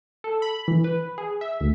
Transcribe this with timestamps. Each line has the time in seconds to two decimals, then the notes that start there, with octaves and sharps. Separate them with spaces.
0.24 A4
0.42 B5
0.68 E3
0.84 B4
1.18 G#4
1.41 E5
1.61 D2